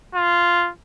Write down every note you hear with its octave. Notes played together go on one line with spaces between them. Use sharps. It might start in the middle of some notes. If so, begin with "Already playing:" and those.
F4